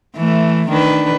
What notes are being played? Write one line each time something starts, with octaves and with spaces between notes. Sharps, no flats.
E3 A3
D#3 D4 B4